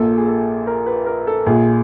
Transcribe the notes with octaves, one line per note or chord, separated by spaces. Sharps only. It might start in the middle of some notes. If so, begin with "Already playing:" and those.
Already playing: A#1 A#2 A4
G#4
A4
A#4
B4
A#4
A4
A#1 A#2 G#4